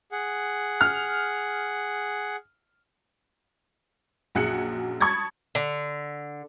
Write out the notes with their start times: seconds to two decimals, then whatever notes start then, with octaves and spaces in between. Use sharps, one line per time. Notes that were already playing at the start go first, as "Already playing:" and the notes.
0.12 G#4 F#5
0.81 F6
4.35 A#1 F#2 F#4 G#4 F#6 C#7
5.01 A5 B5 C#6 D#6 G#6 A6
5.55 D3